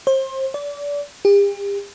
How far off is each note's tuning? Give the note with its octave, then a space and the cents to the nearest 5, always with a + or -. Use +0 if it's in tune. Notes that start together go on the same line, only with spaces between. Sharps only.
C5 +30
D5 -30
G4 +40